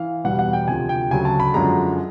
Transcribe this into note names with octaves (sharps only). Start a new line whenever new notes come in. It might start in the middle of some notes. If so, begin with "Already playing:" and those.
Already playing: E3 F5
E2 B2 G3 B3 F#5
F#5
G5
D2 C3 F3 G#5
G5
D2 C#3 F#3 G#5
A5
B5
F#2 D3 F3 G#3 A#5